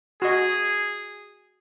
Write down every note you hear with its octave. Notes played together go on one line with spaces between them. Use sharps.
F#4 G#4 D#5